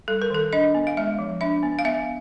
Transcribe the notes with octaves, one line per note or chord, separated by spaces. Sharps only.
G3 A4
A#4
D#3 A4
D4 D#5
B3
F5
G#3 E5
F3
D4 E5
B3
F5
B3 E5